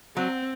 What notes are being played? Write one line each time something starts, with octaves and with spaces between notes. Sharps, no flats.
F#3 C4